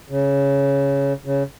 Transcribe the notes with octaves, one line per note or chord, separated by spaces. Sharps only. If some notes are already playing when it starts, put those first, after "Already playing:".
C#3
C#3